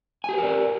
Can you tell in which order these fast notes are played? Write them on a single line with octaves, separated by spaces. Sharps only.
G#5 G4 B4 A#4 D5